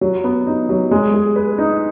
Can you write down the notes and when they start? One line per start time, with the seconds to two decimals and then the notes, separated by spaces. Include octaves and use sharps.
0.01 F#3
0.24 B3
0.47 D#4
0.69 F#3
0.91 G#3
1.14 G#4
1.36 B4
1.58 D#4